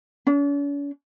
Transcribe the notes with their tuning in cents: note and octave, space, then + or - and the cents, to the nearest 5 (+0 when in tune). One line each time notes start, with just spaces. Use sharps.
C#4 +45